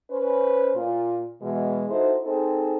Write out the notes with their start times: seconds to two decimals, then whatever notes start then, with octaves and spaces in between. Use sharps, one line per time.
0.10 C#4 B4 C5
0.75 A#2 F4
1.41 B2 E3 G#3
1.90 D#4 E4 F#4 A4 C5
2.24 C4 D#4 G#4 A4 C5